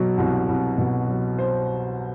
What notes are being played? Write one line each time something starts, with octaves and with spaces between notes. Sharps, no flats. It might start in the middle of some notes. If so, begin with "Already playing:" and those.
Already playing: B2 F#3
C2
C2
B2
F#3
C5